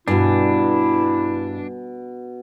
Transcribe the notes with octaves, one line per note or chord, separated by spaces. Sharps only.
G2 B2 D4 E4 G#5